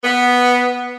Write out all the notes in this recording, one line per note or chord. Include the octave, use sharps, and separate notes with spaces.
B3